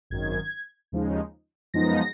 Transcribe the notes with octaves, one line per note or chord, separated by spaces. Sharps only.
G#1 F#2 D#3 G#6
D#2 C#3 F3 G#3 D#4
F#2 F3 G#3 B3 D#4 A#6